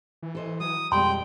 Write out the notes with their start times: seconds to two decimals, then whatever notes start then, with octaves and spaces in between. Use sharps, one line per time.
0.23 E3
0.35 A4 C5 D#5
0.60 F#3 D#6
0.92 F2 B2 G3 G#3 G5 C6